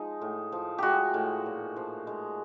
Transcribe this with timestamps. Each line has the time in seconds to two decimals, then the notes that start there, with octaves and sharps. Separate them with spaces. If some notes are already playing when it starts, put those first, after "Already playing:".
Already playing: F3 G#3 D#4
0.21 A2
0.52 F3
0.78 G#3 F#4 G4
1.14 A2
1.46 A#2
1.76 F3
2.07 G#3